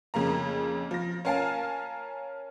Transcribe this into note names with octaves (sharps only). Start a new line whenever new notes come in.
F2 C#3 A#3 A#5
F3 A#6
C#4 A#4 F5 G#5 A5